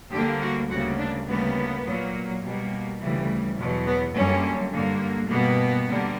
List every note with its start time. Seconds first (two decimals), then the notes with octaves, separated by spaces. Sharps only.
0.12 D2 D3 G3 A#3 G4
0.41 F#4
0.70 D2 C#3 G3 A#3 F#4
0.98 D4
1.27 D2 C#3 G3 A#3 B3
1.85 A#2 F#3 A#3
2.42 B2 G3 A#3
3.00 D2 C#3 E3 G3
3.57 E2 B2 F#3
3.86 B3
4.14 F#2 D3 G3 A#3 C#4
4.72 G2 D3 A#3
5.29 B2 G3 A#3 B3
5.87 D3 G3 A#3